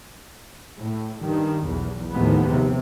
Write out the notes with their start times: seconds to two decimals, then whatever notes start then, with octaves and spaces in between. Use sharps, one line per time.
0.80 A2
1.21 G2 D#3
1.65 B1 E2
2.12 D#2 A2 D#3 F3 G#3 B3
2.49 C3